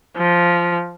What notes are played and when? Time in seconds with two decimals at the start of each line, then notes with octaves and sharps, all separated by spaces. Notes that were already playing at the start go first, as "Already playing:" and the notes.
0.17 F3